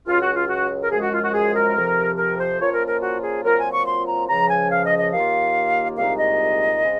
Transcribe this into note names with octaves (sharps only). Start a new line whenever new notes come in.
C#2 C#3 F#3 F4
F#4
F4
F#4
A#4
F#2 F3 G#3 G#4
F#4
F4
F#4
G#4
A#4
F2 C3 F3
A#4
C5
A#2 F3 A#3 C#4 F4 C#5
A#4
A#4
F#4
G#4
A#2 F#3 C4 F4 A#4
G#5
C#6
C6
A#5
C#2 C#3 F3 A#5
G#5
F5
D#5
D#5
D#2 D#3 A#3 F4 F5
C2 A#2 G#3 D#4 F5
D#5
C#3 G#3 C4